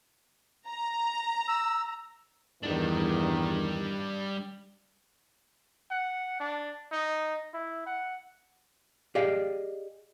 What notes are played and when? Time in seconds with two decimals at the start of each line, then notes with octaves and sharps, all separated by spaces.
0.68 A#5
1.48 E6
2.63 E2 G2 D#3 G3 D4
5.91 F#5
6.40 D4
6.92 D#4
7.54 E4
7.86 F#5
9.15 G4 G#4 D5 D#5 F5